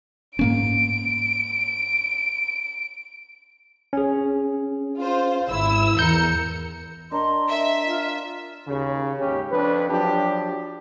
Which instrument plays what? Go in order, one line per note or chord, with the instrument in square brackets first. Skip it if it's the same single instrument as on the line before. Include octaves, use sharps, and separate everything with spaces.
[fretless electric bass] G#2 A#3 C#4 [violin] D7
[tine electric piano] C#4 G#4
[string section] F4 C5
G#1 E4 E6
[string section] E2 A#4 C#7 [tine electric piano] G6
[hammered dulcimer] D4 A#4 [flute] D#5 [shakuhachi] C6
[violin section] E5
[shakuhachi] F4
[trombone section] D#2 C#3
D#2 G#2 C#4 G4
F2 D4 B4
F3 F#3 D4 G4